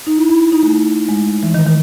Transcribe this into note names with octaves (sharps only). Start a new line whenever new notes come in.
D#4
E4
E4
D#4
A3
G#3
E3
D#3
D#3